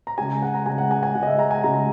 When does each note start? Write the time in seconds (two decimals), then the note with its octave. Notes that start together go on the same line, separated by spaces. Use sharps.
0.07 A#5
0.18 C#3 G#3 G#5
0.42 F#5
0.55 A#5
0.66 C#3 G#3 G#5
0.78 F#5
0.91 G#5
1.03 G#5
1.15 C#3 G#3 F#5
1.23 D#5
1.27 E5
1.39 A#5
1.51 G#5
1.63 C#3 G#3 A#5